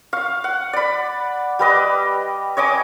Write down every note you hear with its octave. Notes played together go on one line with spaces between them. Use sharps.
F5 C#6
F#5
D5 B5
G3 B4 D#5 D6
C#5 D#5 G#5 D6